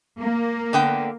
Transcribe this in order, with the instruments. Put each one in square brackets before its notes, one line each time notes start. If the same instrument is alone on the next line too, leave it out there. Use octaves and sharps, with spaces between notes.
[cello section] A#3
[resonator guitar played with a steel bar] D3 B3 G5